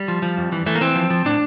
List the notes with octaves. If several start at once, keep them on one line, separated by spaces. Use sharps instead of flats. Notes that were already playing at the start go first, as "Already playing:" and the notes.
Already playing: G3
F3
F3
F2
E3
E3 A3
A#3
E3 C4
F3
F3
A2 D4